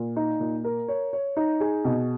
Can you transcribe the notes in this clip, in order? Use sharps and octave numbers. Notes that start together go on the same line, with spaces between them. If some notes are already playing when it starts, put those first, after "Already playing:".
Already playing: A#2
D#4
A#2
A#4
C#5
C#5
D#4
G#4
B2